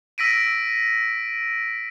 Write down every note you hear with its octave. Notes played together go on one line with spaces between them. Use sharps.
E6 A#6 B6 D7 D#7